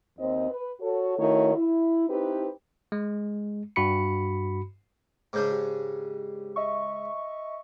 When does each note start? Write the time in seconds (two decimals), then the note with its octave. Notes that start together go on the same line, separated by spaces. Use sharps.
0.19 D#2 C4 D#5
0.50 B4
0.81 F#4 A4 C#5
1.18 D#3 A3 C#4 E4 F#4 C#5
1.56 E4
2.09 C4 D#4 E4 G4 B4
2.92 G#3
3.76 G2 F#4 B5 C#7
5.33 G#2 C#3 D4 D6 G6
5.52 G4
6.56 D#5 E5 C#6